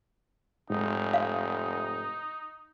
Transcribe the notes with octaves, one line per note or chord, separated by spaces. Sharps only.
F1 G#2 D#4
F5